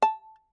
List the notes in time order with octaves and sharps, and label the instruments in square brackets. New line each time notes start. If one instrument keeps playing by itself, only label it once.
[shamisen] A5